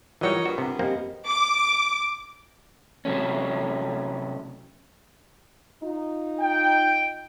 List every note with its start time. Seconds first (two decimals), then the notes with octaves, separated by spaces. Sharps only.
0.21 E3 F#3 G3 D#4 F4 A#4 C#5 D#5
0.45 G2 B3 F#4
0.58 C3
0.79 F#2 A#3 C4 G4 D#5
1.26 D6
3.05 C3 F#3 A3 C#4
5.83 D#4 F4
6.40 G5